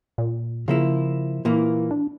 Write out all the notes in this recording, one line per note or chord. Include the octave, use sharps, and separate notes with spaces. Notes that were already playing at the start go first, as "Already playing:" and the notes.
A#2
C#3 F3 A#3 E4
A#2 E3 A#3 E4
D4